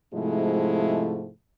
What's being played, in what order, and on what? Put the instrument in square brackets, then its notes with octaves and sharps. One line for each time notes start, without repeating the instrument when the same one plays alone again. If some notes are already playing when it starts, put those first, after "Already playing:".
[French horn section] G#2 C3 F3 G#3 A3 E4